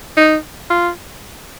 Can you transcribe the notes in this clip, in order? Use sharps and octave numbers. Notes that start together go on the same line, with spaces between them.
D#4
F4